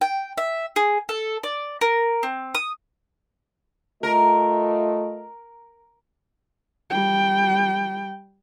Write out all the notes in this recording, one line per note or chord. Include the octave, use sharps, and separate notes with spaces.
G5
E5
G#4
A4
D5
A#4
C4
D#6
A3 F4 A#4 D#5
G3 G5